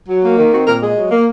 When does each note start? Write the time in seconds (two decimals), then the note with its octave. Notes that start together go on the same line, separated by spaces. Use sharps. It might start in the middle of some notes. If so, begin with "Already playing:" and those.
0.08 F#3
0.23 A#3
0.38 D#3
0.52 C4 F#4
0.67 A#2 A#4
0.82 G#3 G#4
0.97 F#3
1.11 A#3